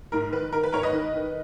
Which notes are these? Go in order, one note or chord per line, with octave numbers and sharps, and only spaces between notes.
G#2 A#4
D#3 B4
D#3 A#4
B4
G#2 A#4 C#5
B4 D#5
D#3
D#3